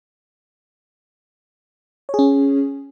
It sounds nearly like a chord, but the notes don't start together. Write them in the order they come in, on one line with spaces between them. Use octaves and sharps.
C#5 G#4 C#4